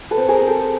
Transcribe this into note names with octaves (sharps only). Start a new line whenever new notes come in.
A4 B4
C4
G#4 A#4
C4
G4 A4